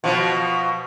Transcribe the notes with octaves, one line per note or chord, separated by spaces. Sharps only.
B2 F3